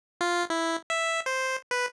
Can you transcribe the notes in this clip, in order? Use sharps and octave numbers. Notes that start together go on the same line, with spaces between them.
F4
E4
E5
C5
B4